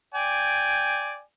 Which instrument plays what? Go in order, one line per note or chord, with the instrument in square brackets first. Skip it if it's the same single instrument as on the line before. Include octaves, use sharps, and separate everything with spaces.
[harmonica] D5 G5 G#5